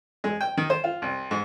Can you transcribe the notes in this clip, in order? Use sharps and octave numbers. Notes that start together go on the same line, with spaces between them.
G#3
G5
D#3
C5
F4
C2
G#2